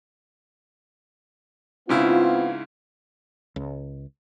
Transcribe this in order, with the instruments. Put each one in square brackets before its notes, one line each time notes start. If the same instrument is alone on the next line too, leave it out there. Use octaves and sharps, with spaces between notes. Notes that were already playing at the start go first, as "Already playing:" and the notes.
[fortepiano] G#2 C#3 E4 [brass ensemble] B3 C4 F4
[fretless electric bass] C#2